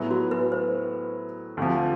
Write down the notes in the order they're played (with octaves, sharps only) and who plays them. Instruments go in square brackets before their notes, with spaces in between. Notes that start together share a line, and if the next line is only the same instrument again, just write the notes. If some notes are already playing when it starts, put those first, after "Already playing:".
Already playing: [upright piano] A2 F#3 B3 E4 G#4
[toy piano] F#4
B4
C5
[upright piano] D2 C3 F3